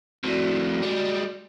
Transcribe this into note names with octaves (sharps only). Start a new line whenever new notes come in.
F2 A2 F#4 D5
G3 G#3